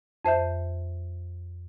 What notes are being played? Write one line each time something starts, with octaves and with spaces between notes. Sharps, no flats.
F2 C5 E5 G6